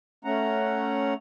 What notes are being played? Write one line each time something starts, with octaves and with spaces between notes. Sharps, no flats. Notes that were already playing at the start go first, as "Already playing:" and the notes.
A3 C#4 F#5 A#5